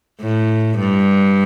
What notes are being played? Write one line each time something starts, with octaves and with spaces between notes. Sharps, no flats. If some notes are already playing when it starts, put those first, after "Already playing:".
A2
G2